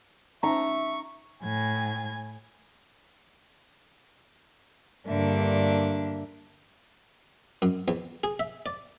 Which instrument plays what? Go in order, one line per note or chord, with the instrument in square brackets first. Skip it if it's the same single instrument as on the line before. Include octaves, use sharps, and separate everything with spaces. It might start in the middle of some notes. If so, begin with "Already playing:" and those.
[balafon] C#4 D#4 [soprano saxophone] E5 [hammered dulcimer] A#5 [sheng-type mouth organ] C#6
[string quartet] A2 G#5 G#6
G2 D3 A#3 D4 E5
[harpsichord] F#2
E2
G#4
E5
D5